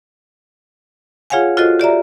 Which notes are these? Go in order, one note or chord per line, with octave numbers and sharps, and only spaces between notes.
F4 G#4 C#5 F5 F#5 G#5
F4 F#4 A4 C5 D#5
G4 D5 E5 A#5